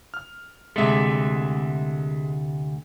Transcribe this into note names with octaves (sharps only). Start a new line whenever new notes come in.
F6
D2 C3 G#3 A3 E5